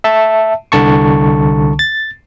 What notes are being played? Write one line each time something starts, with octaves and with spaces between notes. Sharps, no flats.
E5 A5
C2 D3 A5 C#6
A6